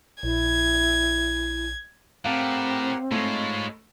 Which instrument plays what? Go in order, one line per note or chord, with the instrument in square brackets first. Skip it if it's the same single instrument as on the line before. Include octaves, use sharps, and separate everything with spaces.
[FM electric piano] A#1 [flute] E4 [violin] G#6
[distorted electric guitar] A2 [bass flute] C4 [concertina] G4 A#4 F#5 [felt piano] F5
[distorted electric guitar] G#2 G#3 [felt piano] A3 [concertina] F4 C#5 B5